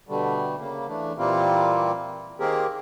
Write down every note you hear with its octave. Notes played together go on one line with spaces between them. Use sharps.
B2 D3 G3 A3
C#3 A#3
E3 A3 D4
A#2 E3 G3 A#3 C4 F4
D#3 A#3 C4 G4 G#4 A#4